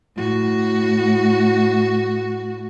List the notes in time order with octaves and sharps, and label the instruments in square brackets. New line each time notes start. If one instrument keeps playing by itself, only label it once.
[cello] A2 F#4